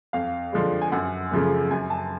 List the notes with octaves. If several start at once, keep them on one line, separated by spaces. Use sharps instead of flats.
F2 F5
D3 F3 G#3
G#5
F#2 F#5
C#3 F3 A3
F#2 G#5
A5